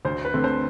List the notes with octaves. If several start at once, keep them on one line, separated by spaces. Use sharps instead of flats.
D2 C5
B4
D3 A3 C4
C5